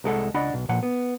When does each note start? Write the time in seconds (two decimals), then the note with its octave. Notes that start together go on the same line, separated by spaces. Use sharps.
0.04 C2 G#3 A4 F#5
0.34 C#2 D4 D#5 F#5 B5
0.54 B1
0.69 A#2 F3 F#5
0.83 B3